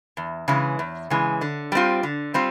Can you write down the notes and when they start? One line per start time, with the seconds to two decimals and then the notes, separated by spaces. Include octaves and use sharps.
0.17 E2
0.48 C#3 E3 G#3
0.79 E2
1.10 C#3 E3 G#3
1.41 D3
1.72 G3 C4 F4
2.03 D3
2.34 G3 C4 F4